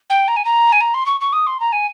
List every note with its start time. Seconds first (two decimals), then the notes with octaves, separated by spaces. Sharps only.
0.10 G5
0.28 A#5
0.36 G#5
0.45 A#5
0.72 G#5
0.81 A#5
0.94 C6
1.06 C#6
1.21 C#6
1.33 D#6
1.47 C6
1.60 A#5
1.72 G#5